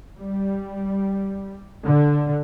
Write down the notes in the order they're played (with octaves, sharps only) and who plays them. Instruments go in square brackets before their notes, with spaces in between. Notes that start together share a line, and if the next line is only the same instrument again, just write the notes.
[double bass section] G3
D3